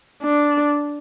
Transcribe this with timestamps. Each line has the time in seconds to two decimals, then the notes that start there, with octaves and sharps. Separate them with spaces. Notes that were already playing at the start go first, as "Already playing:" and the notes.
0.23 D4